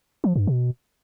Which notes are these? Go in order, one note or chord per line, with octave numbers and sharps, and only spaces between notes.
F3
G2
B2